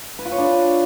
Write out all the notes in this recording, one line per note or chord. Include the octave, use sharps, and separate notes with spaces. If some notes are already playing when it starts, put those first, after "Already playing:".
B4
F4
C#5
D4